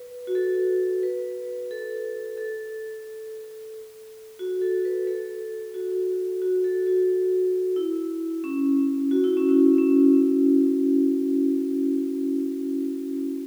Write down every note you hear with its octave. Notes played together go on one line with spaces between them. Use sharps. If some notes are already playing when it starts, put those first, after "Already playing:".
Already playing: B4
F#4
A4
B4
A4
A4
F#4
A4
B4
A4
F#4
F#4
A4
F#4
E4
C#4
F#4
E4
C#4
E4
C#4